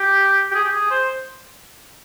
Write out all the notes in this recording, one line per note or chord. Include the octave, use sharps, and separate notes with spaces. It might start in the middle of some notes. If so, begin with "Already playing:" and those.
Already playing: G4
G4
G#4
G4
G#4
C5